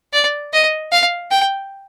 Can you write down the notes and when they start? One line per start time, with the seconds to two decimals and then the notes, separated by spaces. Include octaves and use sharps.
0.13 D5
0.53 D#5
0.92 F5
1.31 G5